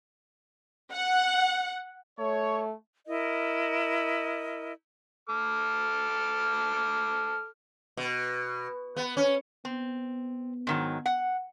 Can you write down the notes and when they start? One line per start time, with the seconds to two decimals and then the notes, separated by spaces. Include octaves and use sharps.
0.92 F#5
2.19 A3 C#5
3.07 E4 A#4 D#5
5.29 A4 D6 F6
7.97 B2
8.96 B3
9.17 C#4
9.65 B3 C4
10.67 G#2 D#3 F#3
11.06 F#5